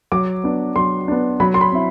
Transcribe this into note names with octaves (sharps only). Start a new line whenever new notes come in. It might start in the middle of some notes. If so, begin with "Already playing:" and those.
F#3 D6
B3 D4
F#3 C6
B3 D4
F#3 B5
C6
B5
C4 E4